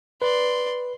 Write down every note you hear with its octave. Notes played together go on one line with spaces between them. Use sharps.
B4 D5 C6